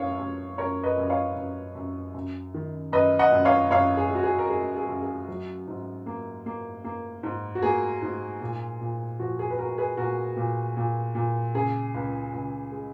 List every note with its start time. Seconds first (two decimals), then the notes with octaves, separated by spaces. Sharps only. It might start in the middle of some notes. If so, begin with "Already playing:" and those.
Already playing: F#2 C#5 F5
0.19 F#2
0.58 F#2 A#4 C#5
0.83 B4 D#5
0.97 F#2
1.03 D#5
1.10 C#5 F5
1.36 F#2
1.75 F#2
2.14 F#2
2.54 D#3
2.92 F#2 B4 D#5
3.19 D#5 F#5
3.32 F#2
3.45 C#5 F5
3.71 F#2 C#5 F5
3.97 G#4
4.11 G#3 F#4
4.23 G#4
4.38 A#4
4.49 G#3 G#4
4.76 G#4
4.89 F#2
5.02 G#4
5.28 F#3
5.67 G#2
6.06 A#3
6.46 A#3
6.84 A#3
7.23 G#2
7.55 F#4
7.63 A#3 G#4
8.02 G#2
8.41 A#2
8.81 A#2
9.20 F3 F#4
9.39 G#4
9.50 B4
9.58 G#3 F#4 A#4
9.78 G#4 B4
9.97 A#2 F#4 A#4
10.36 A#2
10.77 A#2
11.15 A#2
11.55 C#3 G#4
11.94 C#2
12.33 C#2
12.72 G#3